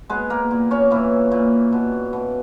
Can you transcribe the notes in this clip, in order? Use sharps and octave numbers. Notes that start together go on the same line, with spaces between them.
G#3 B3 G#4
A#3 A#4
A#2
C#4 C#5
A#2 E3 E4
A#2
B2
B2